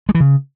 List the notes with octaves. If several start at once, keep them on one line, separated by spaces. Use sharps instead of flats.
G#3
E3
C#3